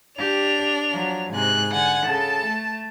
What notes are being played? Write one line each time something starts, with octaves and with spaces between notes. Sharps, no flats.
D4 G4 F7
F3 F#3
G#2 C3 G#5 F#6
D3 F#5 G#5
C#3 A4 A5
A3